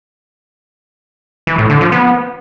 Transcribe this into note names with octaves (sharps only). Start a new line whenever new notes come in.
E3
A2
D3
F3
B3